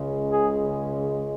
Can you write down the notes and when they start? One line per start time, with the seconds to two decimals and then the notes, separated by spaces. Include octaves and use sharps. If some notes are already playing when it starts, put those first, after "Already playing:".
Already playing: C#2 C#3 G#3
0.30 G#4